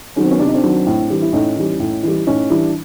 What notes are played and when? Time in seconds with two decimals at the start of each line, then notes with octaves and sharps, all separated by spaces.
0.16 D#3 F#3 C#4
0.24 C4
0.30 B3 C#4
0.39 C3 D4
0.47 D#4
0.54 C4 D4
0.63 D#3 F#3
0.87 A2
1.10 E3 G3
1.22 E4
1.33 A2 C#4 D#4
1.56 E3 G3
1.80 A2
2.03 E3 G3
2.26 A2 C#4 D#4
2.50 E3 G3 D4 E4